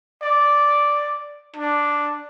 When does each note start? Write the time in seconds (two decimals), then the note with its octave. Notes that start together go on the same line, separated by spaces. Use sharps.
0.22 D5
1.56 D4